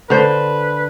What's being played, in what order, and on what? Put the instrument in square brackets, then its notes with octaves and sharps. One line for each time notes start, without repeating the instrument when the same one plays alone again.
[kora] D3 C5 [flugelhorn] B4